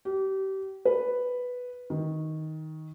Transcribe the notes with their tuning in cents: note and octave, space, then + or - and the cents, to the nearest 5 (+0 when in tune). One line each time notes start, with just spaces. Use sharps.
G4 -30
B4 +0
D#3 +10